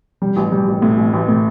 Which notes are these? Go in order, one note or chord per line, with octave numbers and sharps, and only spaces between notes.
G3
A1
G3
A1
A2
A1
A1
A2